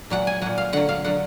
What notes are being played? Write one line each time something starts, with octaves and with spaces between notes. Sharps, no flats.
A#2 F#3 F#5
G#5
A#2 F#3 F#5
F5
D3 F#3 F#5
F5
D3 F#3 F#5